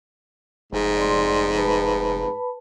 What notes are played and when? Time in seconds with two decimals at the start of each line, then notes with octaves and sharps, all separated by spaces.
0.73 F1 G#2
0.97 D5 C6
1.56 B4 A5 B5